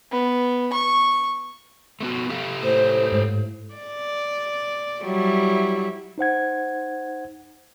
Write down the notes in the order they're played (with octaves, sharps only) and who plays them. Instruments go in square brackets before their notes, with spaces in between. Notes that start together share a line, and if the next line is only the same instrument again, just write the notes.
[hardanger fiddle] B3
C#6
[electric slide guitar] A3 B3 F#4
G4 A4 F5
[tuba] A2 [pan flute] C5
[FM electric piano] G#2
[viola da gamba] D5
F#3 G3 E4
[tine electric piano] D#4 C5 F#5 G#6